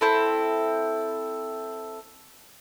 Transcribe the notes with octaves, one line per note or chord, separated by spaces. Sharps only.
C4 E4 A4